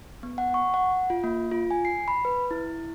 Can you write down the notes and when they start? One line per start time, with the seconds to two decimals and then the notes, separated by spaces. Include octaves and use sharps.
0.23 B3
0.38 F#5
0.54 C#6
0.74 F#5
1.10 F4
1.24 A#3
1.51 F4
1.71 G#5
1.85 C7
2.08 B5
2.25 B4
2.51 E4